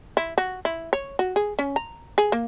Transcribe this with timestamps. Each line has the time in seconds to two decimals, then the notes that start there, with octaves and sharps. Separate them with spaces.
0.17 E4
0.38 F#4
0.65 E4
0.93 C#5
1.19 F#4
1.36 G#4
1.59 C#4
1.76 A#5
2.18 G#4
2.32 A#3